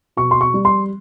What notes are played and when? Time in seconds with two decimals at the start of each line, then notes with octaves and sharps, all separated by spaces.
0.17 B2 C#6
0.31 C6
0.41 C#6
0.54 G3
0.65 C6